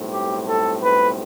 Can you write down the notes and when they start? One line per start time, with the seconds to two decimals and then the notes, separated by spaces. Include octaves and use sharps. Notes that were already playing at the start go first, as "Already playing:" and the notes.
Already playing: B1 A2 G3 C4
0.12 G4
0.47 A4
0.83 B4